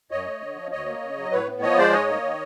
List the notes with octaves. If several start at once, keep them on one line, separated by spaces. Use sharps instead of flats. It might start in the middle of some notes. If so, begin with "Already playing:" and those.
F#2 C#5 D#5
A3
D3
F3
D2 C#5 D#5
A#3
C#3
F#3
A2 B4 C#5
B3
F3 C#5 D#5
G#3 C5 D5
G#2 C#5 D#5
A#3
D#3